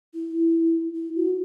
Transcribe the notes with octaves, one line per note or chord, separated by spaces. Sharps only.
E4
E4
F#4